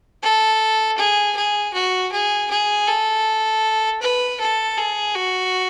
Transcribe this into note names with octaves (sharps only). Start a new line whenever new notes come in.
A4
G#4
G#4
F#4
G#4
G#4
A4
B4
A4
G#4
F#4